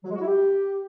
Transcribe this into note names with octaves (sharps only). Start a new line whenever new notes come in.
F#3
G#3
F#4
E4
G4